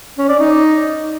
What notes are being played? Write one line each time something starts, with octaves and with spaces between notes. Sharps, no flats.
C#4
D5
D#4